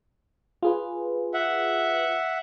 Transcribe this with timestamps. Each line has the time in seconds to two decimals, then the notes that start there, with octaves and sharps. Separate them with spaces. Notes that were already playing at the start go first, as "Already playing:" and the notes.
0.63 F4 G#4 B4
1.34 E5 F#5